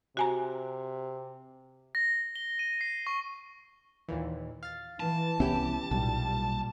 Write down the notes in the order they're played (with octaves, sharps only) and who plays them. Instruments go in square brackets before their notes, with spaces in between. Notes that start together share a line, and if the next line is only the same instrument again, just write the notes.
[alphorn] C3 [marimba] F#4 G#5 A#5
[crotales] A#6
G7
D#7
C7
C#6
[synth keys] D#2 A#2 E3
F5 A6
[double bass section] E3 [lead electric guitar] A5
[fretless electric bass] C2 B3 C#4 [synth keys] E4 G4
[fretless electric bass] B1 [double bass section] A#2 G3